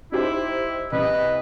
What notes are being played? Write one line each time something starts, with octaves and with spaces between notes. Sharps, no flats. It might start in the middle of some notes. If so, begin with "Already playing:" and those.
D#4 E4 G4 C5
C2 B4 D#5